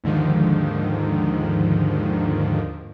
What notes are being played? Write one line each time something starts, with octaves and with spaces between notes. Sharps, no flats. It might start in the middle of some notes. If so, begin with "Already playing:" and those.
D#2 G#2 D3 D#3 F3